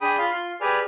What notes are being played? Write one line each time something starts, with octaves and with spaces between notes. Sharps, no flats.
D4 G#4 G5 B5 D#6
F4 F5 B5 C6
F4 C6
G4 G#4 B4 D5 G#5 F6